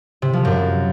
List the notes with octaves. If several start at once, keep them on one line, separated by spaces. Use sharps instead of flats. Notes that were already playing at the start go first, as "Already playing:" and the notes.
C3
F3
F#2